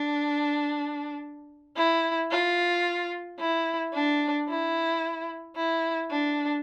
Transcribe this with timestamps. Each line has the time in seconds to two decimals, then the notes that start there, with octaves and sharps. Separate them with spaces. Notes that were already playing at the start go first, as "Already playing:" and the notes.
Already playing: D4
1.77 E4
2.31 F4
3.39 E4
3.94 D4
4.49 E4
5.56 E4
6.10 D4